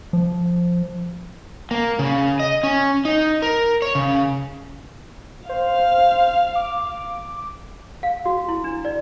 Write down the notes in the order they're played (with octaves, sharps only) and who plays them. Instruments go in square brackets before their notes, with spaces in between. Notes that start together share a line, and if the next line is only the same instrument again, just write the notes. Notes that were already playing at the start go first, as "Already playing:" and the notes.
[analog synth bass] F3
[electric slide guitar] A#3
C#3
D#5
C#4
D#4
A#4
C#5
C#3
[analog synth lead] C5 [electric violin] F5
[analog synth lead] D6
[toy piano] F5
F#4
E4
D4
D5